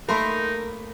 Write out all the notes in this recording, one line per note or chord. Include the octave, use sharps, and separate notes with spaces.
A3 A#3 D#4 A#4 B5 C6